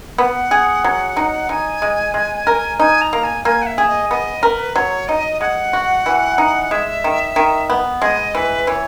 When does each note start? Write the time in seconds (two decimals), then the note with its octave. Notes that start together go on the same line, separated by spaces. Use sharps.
0.18 B3 F#5
0.51 G#4
0.84 F#3
1.17 D#4
1.49 D#4 G#5
1.82 G#3
2.14 G#3
2.47 A#4
2.79 D#4 G#5
3.01 A#5
3.13 A#3
3.24 G#5
3.45 A#3 G#5
3.62 F#5
3.66 E5
3.78 G#4
3.88 D#5
4.10 B3 D#5
4.42 A#4 B4
4.76 F#3 C#5
5.08 D#4 D#5
5.41 G#3 F#5
5.73 F#4
6.06 E3
6.38 D#4
6.71 G#3 E5
7.04 D#3
7.36 D#3
7.70 B3
8.02 G#3 D#5
8.35 E3 B4
8.67 E3 C#5